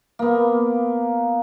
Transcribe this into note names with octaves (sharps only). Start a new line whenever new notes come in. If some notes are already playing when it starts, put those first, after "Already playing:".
A#3 B3